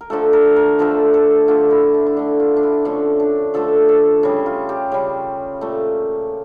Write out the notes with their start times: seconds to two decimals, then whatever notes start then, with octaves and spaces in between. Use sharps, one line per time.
0.01 A#4
0.10 D3 F3 A3 A4
0.33 A#4
0.56 A#4
0.79 D3 F3 A3 A4
1.14 A4
1.48 D3 A3 F4
1.70 E4
1.94 D4
2.06 E4
2.16 D3 A3 D4
2.40 F4
2.57 D4
2.63 E4
2.85 D3 F3 A3 C#4
3.20 D4
3.54 D3 F3 A3 A4
3.89 A4
4.23 C#3 G3
4.46 F4
4.69 G4
4.92 C#3 G3
5.61 A#2 A3